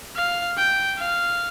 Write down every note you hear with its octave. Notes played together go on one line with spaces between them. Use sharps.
F5
G5
F5